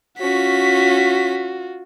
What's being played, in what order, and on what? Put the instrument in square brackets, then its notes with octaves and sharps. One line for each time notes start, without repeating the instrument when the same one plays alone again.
[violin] C#4 B6 [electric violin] F4 F#4